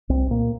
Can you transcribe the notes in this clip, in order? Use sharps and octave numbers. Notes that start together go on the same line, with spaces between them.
C2 C4
A#2 A#3